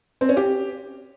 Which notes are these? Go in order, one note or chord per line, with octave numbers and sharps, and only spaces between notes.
C4
C#4
G4